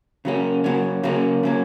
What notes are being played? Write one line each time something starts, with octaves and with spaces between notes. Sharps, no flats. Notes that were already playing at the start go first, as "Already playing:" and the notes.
C#3 F#3 A#3 C#4
C#3 F#3 A#3 C#4
C#3 F#3 A#3 C#4
C#3 F#3 A#3 C#4